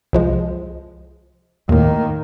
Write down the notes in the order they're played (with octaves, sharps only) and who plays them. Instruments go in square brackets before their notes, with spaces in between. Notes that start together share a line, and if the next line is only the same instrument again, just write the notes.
[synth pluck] C2 F3 G#3
[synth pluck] D#2 A2 [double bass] D#3 A#3